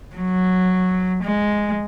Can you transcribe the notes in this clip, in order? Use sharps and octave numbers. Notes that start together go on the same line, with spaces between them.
F#3
G#3